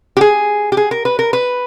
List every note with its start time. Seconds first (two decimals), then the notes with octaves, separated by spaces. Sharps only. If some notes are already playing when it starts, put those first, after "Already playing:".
0.17 G4
0.21 G#4
0.72 G4
0.77 G#4
0.91 A#4
1.05 B4
1.19 A#4
1.33 B4